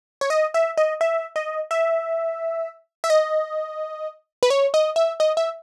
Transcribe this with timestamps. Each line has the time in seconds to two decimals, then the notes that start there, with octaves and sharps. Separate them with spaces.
0.21 C#5
0.30 D#5
0.54 E5
0.78 D#5
1.01 E5
1.36 D#5
1.71 E5
3.04 E5
3.10 D#5
4.43 B4
4.50 C#5
4.74 D#5
4.96 E5
5.20 D#5
5.37 E5